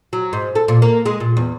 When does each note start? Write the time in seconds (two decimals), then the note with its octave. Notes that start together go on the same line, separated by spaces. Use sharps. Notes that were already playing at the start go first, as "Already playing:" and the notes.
0.13 F#3
0.33 G#2
0.55 A4
0.68 A#2
0.82 A#3
1.06 G#3
1.20 A#2
1.37 E2